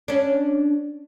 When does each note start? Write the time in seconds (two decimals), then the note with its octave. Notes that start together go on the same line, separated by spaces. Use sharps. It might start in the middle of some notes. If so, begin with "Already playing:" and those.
0.08 C#4 D4